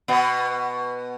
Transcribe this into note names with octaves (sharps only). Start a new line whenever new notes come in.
B2 B3